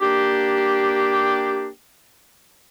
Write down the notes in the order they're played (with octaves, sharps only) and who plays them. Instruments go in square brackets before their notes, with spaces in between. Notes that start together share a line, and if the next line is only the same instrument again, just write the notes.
[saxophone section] A#3 D4 G4